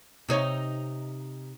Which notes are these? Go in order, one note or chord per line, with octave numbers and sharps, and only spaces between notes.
C3 D#4 C#5